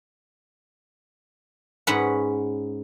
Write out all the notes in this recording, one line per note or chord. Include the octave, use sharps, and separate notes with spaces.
G#2 C#4 B4 F#5